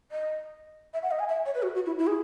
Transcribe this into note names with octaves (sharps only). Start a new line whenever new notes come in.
D#5
E5
F#5
D#5
G#5
E5
C#5
B4
F#4
F#4
E4
E4
G#4